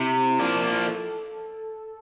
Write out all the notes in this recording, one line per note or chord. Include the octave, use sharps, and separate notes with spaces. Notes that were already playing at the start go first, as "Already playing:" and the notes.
Already playing: C3 E4
F3 A#3 D4
A4